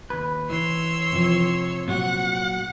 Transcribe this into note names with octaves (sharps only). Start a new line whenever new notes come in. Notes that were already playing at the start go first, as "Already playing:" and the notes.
D#2 B4
E3 C#5 C6 E6
C3 F3
A#2 F#3 F#4 F#5